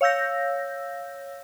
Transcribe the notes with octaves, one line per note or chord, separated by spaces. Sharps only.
C#5 F5 E6 G6 A#6